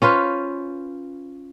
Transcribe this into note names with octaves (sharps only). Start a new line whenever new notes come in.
C#4 F4 B4 C5